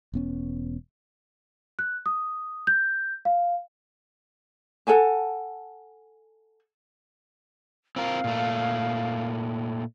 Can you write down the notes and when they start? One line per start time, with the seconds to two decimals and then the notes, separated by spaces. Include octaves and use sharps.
0.13 E1 B3 C#4
1.79 F#6
2.06 D#6
2.67 G6
3.25 F5
4.87 A4 F#5 G#5 A5
7.96 C4 F4 A#4 F5
8.24 A#2 A3